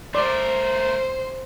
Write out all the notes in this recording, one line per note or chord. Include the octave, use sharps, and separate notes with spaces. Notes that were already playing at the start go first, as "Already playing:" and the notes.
A3 A#4 C5 D5 C6